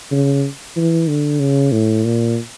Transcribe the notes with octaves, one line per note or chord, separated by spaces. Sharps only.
C#3
E3
D3
C#3
A2
A#2